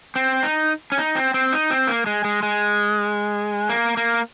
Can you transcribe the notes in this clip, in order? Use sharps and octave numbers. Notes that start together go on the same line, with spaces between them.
C4
D#4
C#4
D#4
C4
C4
D#4
C4
A#3
G#3
G#3
G#3
A#3
A#3